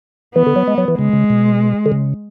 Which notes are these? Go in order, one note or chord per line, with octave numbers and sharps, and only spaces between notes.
E3 B3
D3
F#3
G#3
F#3
E3
C#3 G#3
C#3
B2
D3
C#3